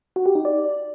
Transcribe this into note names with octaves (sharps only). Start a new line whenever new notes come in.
F#4
G4
D#4
D5